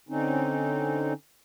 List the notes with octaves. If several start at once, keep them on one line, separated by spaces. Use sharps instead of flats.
D3 C4 C#4 D#4